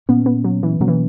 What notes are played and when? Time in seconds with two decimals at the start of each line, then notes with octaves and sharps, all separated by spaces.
0.09 A#2 A#3 B3 C#4
0.26 B3
0.44 F#3
0.63 E3
0.80 B2 F#3 A#3 C#4
0.88 E3